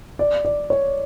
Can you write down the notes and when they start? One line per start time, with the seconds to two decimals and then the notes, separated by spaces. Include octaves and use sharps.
0.19 D5
0.45 D5
0.70 C#5